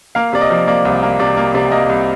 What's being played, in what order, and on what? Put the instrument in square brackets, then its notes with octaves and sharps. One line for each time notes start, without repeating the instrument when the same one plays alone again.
[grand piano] A#3 F5
C3 D5
D#5
F3
A#3 D5
C2
A#3
C3 D5
A#3
C3 D5
A#3 D#5
C2